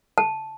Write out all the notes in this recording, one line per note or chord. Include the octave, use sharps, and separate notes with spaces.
A5